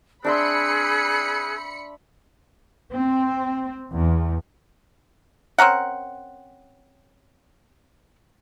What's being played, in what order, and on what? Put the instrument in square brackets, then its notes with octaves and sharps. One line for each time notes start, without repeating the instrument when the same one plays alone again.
[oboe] C4 [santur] D4 E5 C6 [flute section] G#4 F#6 [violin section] B5 C#7
[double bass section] C4
E2
[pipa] C4 C#4 A#4 F#5